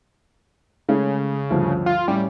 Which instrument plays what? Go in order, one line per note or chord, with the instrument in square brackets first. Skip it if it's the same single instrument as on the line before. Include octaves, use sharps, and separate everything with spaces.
[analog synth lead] C#3 [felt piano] G#3 A3 C#4
[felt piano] D2 G2 F3
[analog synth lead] F4
[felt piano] A2 C#4 [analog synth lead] G3